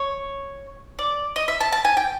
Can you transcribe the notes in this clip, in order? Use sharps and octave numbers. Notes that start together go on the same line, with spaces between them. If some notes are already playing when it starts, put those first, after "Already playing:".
Already playing: C#5
D5
D#5
E5
A5
A5
G#5
G5